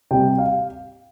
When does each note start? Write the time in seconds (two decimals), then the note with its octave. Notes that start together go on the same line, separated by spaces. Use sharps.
0.11 C3 G3 G5
0.38 F5